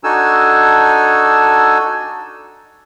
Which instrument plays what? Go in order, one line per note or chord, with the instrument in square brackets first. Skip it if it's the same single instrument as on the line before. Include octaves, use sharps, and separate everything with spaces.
[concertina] D4 D#4 F#4 A4 G#5 E6